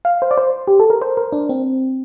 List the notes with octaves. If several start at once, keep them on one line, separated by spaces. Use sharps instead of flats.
F5
C5
D5
C5
G4
A4
A#4
C5
A#4
D4
C4